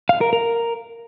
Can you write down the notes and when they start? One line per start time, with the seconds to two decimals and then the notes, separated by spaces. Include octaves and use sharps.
0.09 F5
0.21 A#4
0.33 A#4